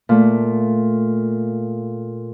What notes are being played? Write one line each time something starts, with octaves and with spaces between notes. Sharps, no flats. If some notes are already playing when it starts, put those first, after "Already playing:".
A#2 A3